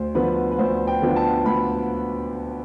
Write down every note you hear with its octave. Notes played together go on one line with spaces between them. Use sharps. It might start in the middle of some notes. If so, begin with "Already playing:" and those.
Already playing: D2 C5
D3 F3 B3 B4
B4
D2 C5
G5
D3 F3 B3
A5
D2 B5